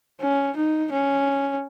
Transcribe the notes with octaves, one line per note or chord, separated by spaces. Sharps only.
C#4
D#4
C#4